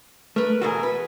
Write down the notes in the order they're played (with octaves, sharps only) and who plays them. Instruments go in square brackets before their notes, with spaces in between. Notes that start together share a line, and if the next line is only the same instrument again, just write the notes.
[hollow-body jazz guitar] A3 [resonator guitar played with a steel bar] A#4 B4
[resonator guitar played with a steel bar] E2 B2 A#4 [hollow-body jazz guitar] F#4 G#4
[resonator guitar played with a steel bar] B4